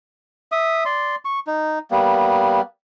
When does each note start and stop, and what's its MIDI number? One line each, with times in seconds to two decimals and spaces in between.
0.52 0.84 76
0.52 0.84 87
0.85 1.15 74
0.85 1.15 84
1.25 1.39 85
1.47 1.79 63
1.91 2.61 55
1.91 2.61 58
1.91 2.61 59